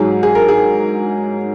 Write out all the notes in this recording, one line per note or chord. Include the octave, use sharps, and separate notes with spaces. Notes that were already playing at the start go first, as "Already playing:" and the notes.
Already playing: G#2 F#3 G#4
G#4
A#4
G#4